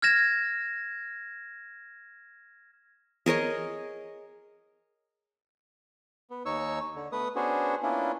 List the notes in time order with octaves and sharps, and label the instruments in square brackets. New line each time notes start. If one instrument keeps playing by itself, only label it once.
[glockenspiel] F6 G#6 A#6 E7
[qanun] G#4 A#4 C#5 D#5
[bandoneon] B3
D#2 D#4 C#5 C#6 E6
D3
A3 B3 B4 D#6
B3 C#4 D4 F#4 G#4 C5
A#3 B3 C#4 D4 E4 F4